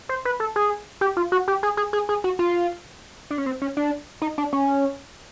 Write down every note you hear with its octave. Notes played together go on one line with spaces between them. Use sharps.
C5
B4
A4
G#4
G4
F4
F#4
G4
G#4
G#4
G#4
G#4
F#4
F4
D4
C#4
C4
C#4
D4
D#4
D4
C#4